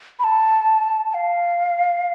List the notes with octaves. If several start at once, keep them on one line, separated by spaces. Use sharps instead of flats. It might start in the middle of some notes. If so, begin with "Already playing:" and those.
B5
A5
A5
F5